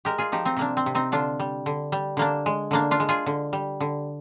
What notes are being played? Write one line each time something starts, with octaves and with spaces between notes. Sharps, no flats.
G#3 G4 A#4
F4 G#4
F3 D#4 G4
C4 D#4
C3 A#3 D4
C4
C3
C4 D#4
D3 D4 F4
G3
D3
G3
D3 A#3 D4
G#3
D3 A#3 D4
D4 F4
G#3
F4 G#4
D3
G3
D3